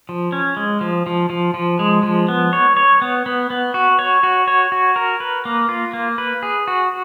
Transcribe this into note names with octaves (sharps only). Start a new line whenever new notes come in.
F3
C#4
G#3
F3
F3
F3
F3
G#3
F3
B3
C#5
C#5
B3
B3
B3
F#4
C#5
F#4
C#5
F#4
A#4
B4
A#3
F4
A#3
B4
G#4
F#4